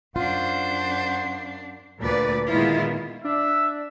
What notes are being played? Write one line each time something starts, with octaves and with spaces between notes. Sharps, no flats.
F#2 D4 F4 C5 F#5
D2 A#2 B4 D5
A#2 D#3 G#3 B3 E4 F4
D4 E5